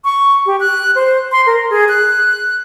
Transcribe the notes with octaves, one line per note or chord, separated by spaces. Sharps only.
C#6
G4
F#6
C5
C6
A#4
G#4
F#6